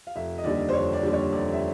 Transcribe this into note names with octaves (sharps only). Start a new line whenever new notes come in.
F5
F1 E5
D#5
D#2 D3 G3 D5
C5
F1 C#5
D5
D#2 D3 G3
C#5
F1 D5
E5